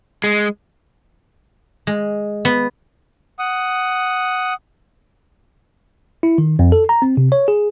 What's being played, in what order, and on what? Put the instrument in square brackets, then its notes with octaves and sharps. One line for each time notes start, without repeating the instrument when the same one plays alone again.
[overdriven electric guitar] G#3
[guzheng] G#3
B3
[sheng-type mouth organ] F#5 D#6
[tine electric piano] E4
D#3
F2
A4
A#5
C4
C3
C#5
G#4